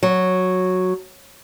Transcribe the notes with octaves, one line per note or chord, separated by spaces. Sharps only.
F#3